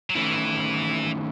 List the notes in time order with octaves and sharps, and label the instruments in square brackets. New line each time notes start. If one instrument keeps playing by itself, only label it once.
[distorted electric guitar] F#3
[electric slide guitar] D#3 A3 C#4 E4 [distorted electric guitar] E3